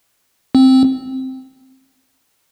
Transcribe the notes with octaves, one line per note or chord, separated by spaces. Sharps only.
C4